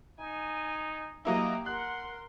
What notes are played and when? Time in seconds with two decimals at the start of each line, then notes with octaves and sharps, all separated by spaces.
0.19 D#4 G#5
1.25 F#3 A#3 E4 G4 D#5 A#5
1.66 A#4 F#5 C6 F#6